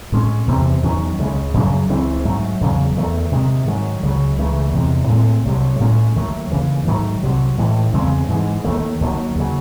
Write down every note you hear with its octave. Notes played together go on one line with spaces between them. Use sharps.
A2 G#3 C#4
E2 C3 E3 C4
E2 D#3 F#3 C#4
C#2 C#3 E3 G#3
F#2 C#3 F#3
C#2 C#3 E3 C4
G#2 F#3 A3
E2 C#3 F#3
E2 D#3 A3
C3 D#3 G#3
G#2 D#3 F#3
C#2 C#3 F#3
C#2 C#3 E3 A3
E2 C3 E3 G#3
A2 G#3 C4
C2 C3 F#3
A2 G#3 C#4
D#2 D#3 F#3 A3
D#2 C#3 E3
G#2 D#3 F#3 A3
C2 C3 F#3
A2 E3 G#3
E2 C#3 G#3 C4
G#2 E3 G#3
D#2 D#3 A3
D#2 D#3 F#3
D#2 C#3 F#3